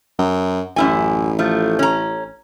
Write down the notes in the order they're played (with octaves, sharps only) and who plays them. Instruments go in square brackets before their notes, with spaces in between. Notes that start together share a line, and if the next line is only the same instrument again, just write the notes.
[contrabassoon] F#2
[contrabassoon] A1 [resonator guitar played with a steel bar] F#2 E4 G#5
[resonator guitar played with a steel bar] F3 A3
C#4 A#5